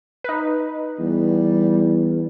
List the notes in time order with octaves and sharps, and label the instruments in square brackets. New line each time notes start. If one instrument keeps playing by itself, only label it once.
[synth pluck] D#4 B4
[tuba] E2 [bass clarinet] G3